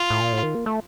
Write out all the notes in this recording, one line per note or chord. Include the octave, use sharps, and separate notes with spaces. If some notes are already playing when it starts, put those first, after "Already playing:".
Already playing: F4
A2
A#2
A2
D#3
A#3
A3